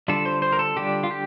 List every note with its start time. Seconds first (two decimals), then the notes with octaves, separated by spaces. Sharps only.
0.08 D3 G3 D4 F4 A4
0.26 C5
0.42 C5
0.52 A#4
0.59 A4
0.76 D3 G3 D4 F4 G4
1.04 F4
1.11 G4